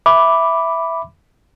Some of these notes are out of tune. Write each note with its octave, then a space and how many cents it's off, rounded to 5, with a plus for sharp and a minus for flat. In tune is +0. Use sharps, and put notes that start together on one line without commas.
E5 +0 B5 +0 D6 +0